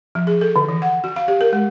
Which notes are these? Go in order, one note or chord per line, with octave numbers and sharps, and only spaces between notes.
F3
G#4
A4
D3
E3
F#5
F#4
F5
G4
A#4
G#3